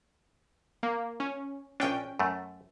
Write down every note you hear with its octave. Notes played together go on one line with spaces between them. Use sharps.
A#3
C#4
A#1 C#4 D4 G5
F#2 A3